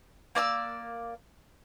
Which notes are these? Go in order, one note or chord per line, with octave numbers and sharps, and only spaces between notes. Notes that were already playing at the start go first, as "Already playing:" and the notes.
A#3 D5 A5 E6